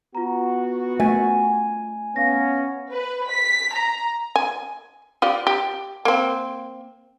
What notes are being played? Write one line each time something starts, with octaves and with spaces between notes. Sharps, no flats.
B3 F4 F#4 A#5
A3 G#5
B3 C#4 F5 A#6
B4
B6
A#5
G#5
F4 G4 D5
G4
A#3 C4